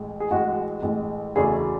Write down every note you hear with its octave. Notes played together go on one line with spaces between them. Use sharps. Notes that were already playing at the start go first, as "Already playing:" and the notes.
Already playing: A1 A2 G#3
G#4
A1 A2 G#3 F#4
A1 A2 G#3
F#1 E2 C#3 F#3 A3 G#4